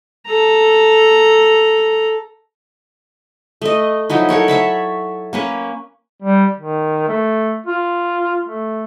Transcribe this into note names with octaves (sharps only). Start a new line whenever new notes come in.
A4 A#5
A3 D#5
F3 F#3 D#4 E4
A4 A#4 C#5 F#5
C#5 E5 A5 B5
A#3 C#4 B4
G3
D#3
A3
F4
A3